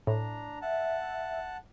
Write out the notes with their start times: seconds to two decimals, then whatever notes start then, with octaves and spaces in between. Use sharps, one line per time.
0.07 A2 D4 A#5
0.62 E5 F#5 A5